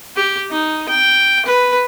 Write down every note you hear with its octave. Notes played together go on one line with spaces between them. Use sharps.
G4
D#4
G5
B4